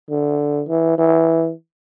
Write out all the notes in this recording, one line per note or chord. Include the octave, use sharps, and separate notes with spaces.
D3
E3
E3